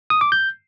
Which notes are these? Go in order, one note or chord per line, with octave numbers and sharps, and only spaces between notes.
D#6
D6
G6